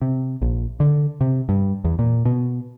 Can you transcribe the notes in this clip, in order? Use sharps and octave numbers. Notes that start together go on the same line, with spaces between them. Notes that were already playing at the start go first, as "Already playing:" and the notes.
C3
A#1
D3
C3
G2
E2
A#2
B2